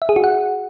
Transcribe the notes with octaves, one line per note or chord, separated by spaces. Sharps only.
E5
G#4
F#4
F#5